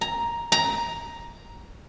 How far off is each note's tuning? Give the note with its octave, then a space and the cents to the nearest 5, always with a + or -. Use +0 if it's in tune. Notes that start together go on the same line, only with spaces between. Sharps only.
A#5 +5
A#5 +10